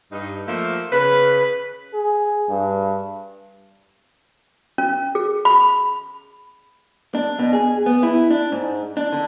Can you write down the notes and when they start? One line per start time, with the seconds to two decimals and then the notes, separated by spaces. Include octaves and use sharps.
0.12 G2 D#4
0.47 F3 A3 A#3
0.92 C#3 B4
1.94 G#4
2.49 G2
4.78 C#4
5.15 G#4
5.45 B5
7.15 D4
7.39 B2
7.53 G#4
7.86 B3
8.03 E4
8.31 D4
8.52 G#2
8.97 D4
9.12 D3